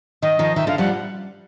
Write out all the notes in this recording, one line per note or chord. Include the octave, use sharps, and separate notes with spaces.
D#3 D#5
D#3 F3
D#3 E5
D3 F5
F3 G3 F#5